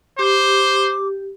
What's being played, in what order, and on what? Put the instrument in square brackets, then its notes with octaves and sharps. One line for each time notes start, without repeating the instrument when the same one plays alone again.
[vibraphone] G4 [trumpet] C5 [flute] D6